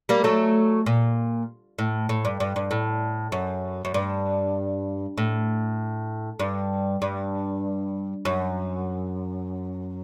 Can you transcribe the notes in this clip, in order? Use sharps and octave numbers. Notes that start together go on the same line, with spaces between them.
G3 A#3
F#3 A3
A#2
A2
A2
G2
G2
G2
A2
F#2
F#2
G2
A2
G2
G2
F#2